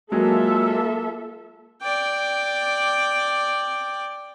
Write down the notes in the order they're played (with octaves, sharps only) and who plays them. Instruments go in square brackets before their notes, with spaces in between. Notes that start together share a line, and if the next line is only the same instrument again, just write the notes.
[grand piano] F#3 G#3 [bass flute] A#3 [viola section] F4 A4 E5
[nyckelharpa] D5 G5